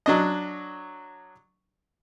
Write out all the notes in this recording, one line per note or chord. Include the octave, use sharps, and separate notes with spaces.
F#3 D4 D#5